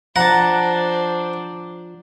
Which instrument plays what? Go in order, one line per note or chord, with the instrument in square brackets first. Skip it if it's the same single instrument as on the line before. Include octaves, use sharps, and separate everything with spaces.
[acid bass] F3 [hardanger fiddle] D4 C5 [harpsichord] F#5 [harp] A5 A#5